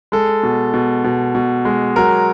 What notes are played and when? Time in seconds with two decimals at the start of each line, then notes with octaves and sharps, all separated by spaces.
0.12 G#3 A4
0.43 B2
0.74 B2
1.04 B2
1.35 B2
1.65 G#3
1.96 F#3 A#4